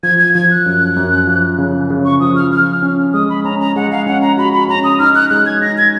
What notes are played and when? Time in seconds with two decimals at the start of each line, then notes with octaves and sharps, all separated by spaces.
0.03 F3 G#6
0.19 G#6
0.35 F3 G#6
0.51 F#6
0.66 F#2
0.96 F#2
1.27 F3
1.58 C#3
1.90 C#3
2.05 C#6
2.20 F3 D#6
2.36 F6
2.52 F3 F6
2.82 C#4
3.13 G#3 D#6
3.30 B5
3.44 C#4 A#5
3.60 A#5
3.76 G#3 F#5
3.91 F5
4.06 C#4 F#5
4.22 A#5
4.37 F#4 B5
4.53 B5
4.68 C#4 A#5
4.84 D#6
4.99 D#4 F6
5.15 F#6
5.30 G#3 F#6
5.46 G#6
5.61 D#4 A#6
5.78 G#6